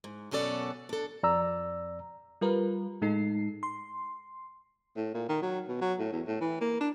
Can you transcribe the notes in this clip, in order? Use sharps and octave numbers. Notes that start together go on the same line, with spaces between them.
G#2
F#2 B2 C#4 A4 D5 F#5
D4 A4
F2 D5 A#5 E6
G3 F4 A#4 B4
A2 G#3 D#4 A4 C7
C6
A2
A#2
D#3
F#3
B2
F#3
A2
E2
A2
E3
A#3
D4